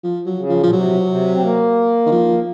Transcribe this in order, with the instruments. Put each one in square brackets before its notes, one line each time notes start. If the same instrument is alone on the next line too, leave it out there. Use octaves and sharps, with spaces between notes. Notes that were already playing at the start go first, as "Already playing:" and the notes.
[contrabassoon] F3
F#3
[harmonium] C#3
[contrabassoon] F3
[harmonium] A#2 [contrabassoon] F3
[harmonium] C3 [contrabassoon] F#3
[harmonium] C3
C4
A#3
[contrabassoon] D#3
F3